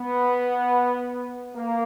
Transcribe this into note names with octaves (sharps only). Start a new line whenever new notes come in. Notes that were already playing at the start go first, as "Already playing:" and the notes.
Already playing: B3
A#3